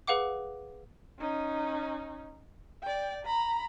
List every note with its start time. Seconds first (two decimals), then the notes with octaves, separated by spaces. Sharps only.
0.07 G#4 B4 F5 F#5 D6
1.19 C#4 D#4
2.83 D5 G5
3.25 A#5 B5